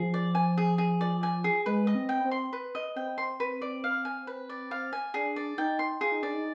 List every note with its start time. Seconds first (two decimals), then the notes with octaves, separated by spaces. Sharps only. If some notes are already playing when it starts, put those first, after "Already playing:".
Already playing: F3 G#4
0.14 D5
0.35 G#5
0.58 G#4
0.78 G#4
1.01 D5
1.23 G#5
1.44 G#4
1.66 G#3 B4
1.87 D#5
1.95 C4
2.09 G5
2.25 C4
2.31 C6
2.53 B4
2.75 D#5
2.96 C4 G5
3.18 C6
3.40 B4
3.62 D5
3.84 F5
4.05 G#5
4.27 B4
4.49 D5
4.71 F5
4.93 G#5
5.14 D4 G#4
5.36 D5
5.58 D#4 G5
5.79 C6
6.01 F4 G#4
6.12 D#4
6.22 D4 D5
6.33 D#4